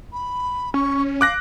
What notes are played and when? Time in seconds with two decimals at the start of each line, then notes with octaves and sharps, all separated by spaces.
0.13 B5
0.74 C#4 C#6
1.21 F5 D6 F#6 A#6